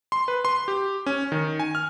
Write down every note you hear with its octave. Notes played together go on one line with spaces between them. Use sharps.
C6
B4
C6
G4
C#4
D#3
G#5
F6